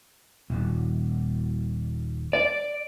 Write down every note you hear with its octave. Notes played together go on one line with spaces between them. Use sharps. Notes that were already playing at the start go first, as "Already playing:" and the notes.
D#1
D5